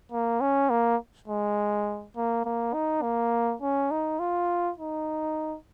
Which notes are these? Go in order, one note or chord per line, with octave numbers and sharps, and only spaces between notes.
A#3
C#4
A#3
G#3
A#3
A#3
D#4
A#3
C#4
D#4
F4
D#4